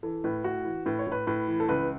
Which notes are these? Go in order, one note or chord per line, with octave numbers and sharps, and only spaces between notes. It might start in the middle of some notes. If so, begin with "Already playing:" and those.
E3 A4
A2 B4
A2 F#4
E3
A2 B4
C#5
A2 B4
A2 B4
E3
A4
C#2 B4